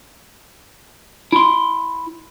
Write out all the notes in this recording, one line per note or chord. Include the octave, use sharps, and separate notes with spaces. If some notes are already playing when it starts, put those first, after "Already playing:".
E4 C6